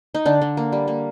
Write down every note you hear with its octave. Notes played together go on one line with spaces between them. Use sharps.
D#4
D3 D4
D3
A#3
G3
A#3